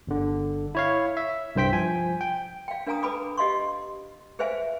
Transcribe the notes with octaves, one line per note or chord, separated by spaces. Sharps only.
G1 D3
E4 C#5 F5
E5
C2 G2 C5 G5 B6
F3 G#5
G5
F5 G5
D4 A#4 F5 G#5 A#5 D#6
A4 B4 G#5 B5 D6 D#6
G4 D#5 F5 C6 C#6
G#4 B4 C5 E5 F5 G#5